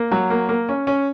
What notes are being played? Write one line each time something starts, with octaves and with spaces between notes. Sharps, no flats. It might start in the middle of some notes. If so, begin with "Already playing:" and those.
Already playing: A#3
F#3
A#3
A#3
C#4
C#4